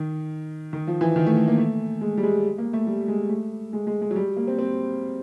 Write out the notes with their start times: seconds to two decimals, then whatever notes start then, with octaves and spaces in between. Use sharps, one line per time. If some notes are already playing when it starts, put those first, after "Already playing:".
Already playing: D#3
0.73 D#3
0.87 F3
1.01 E3
1.16 D#3
1.26 A3
1.37 A3
1.48 A#3
1.58 A3
2.01 G#3
2.18 G3
2.23 G#3
2.58 A#3
2.73 A3
2.87 G3
3.08 G#3
3.30 A3
3.73 G#3
3.87 G#3
4.02 G#3
4.10 F#3
4.16 G3
4.37 A#3
4.47 C4
4.59 C4